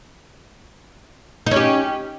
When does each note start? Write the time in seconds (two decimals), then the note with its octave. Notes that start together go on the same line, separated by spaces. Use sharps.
1.46 D#4
1.51 C#4
1.56 G4